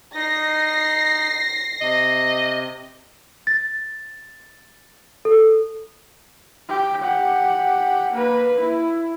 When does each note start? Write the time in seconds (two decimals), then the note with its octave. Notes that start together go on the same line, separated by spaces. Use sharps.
0.15 D#4 D#5 A#6 C7
1.81 C3 D#5
3.47 A6
5.25 A4
6.69 G4
7.02 G4 F#5
8.13 A#3 B4
8.60 E4